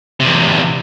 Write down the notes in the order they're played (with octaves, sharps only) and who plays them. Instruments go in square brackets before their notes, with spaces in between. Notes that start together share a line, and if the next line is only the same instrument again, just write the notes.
[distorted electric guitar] E2 C3